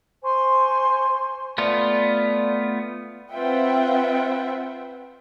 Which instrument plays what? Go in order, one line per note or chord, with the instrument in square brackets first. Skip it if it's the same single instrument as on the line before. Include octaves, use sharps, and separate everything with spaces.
[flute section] C5 G#5 C6 C#6
[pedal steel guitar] A3 B3 F4 [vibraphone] D5
[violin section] C4 F4 B4 E5 F#5 G5